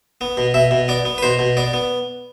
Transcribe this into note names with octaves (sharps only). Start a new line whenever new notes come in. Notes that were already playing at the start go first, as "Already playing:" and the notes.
B3
B2
B2 E5
B2
B3 D5
B3
B4
B2 C5
B2
B3 D5
B3